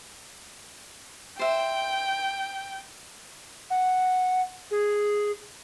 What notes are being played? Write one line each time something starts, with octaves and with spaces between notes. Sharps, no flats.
C5 E5 G5
F#5
G#4